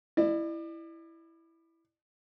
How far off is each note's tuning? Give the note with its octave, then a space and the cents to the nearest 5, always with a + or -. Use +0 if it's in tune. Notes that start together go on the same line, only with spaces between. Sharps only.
E4 +0 D5 +40